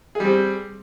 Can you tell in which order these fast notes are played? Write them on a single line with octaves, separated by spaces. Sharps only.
G#4 G3 C4